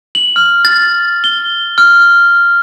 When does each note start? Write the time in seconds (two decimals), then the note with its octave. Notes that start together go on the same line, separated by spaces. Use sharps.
0.15 F#7
0.36 F6
0.65 A6
1.24 G7
1.78 F6